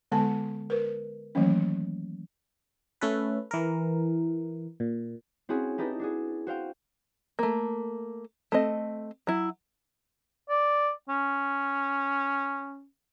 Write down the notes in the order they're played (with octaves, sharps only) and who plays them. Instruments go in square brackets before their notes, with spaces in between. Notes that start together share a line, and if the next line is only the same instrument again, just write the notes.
[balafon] D3 G#3 B3 A4 A5
A#4 B4
D#3 E3 F#3 A3 A#3 C#4
[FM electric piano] A3 C#4 A4 B4
E3 A#4
A#2
[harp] C4 C#4 E4 F#4 G#4
D#4 E4 G4 A4 B4 D#5
D4 F#4 G#4
F#4 C5 F5 G5
[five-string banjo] A3 A#3
A3 C4 D#5
F#3 E4
[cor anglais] D5
C#4